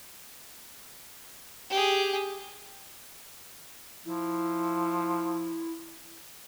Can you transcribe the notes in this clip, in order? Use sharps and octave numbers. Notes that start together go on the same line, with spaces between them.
G4 G#4
F3 E4